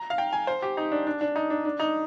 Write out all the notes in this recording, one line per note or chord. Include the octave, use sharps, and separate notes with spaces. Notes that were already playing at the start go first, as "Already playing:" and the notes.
Already playing: A#5
F5
G5
G#5
C5
G4
D#4
D4
D4
D4
D#4
D4
D4
D#4